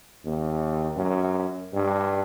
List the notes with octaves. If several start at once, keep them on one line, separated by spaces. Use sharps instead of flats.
D#2
F#2
G2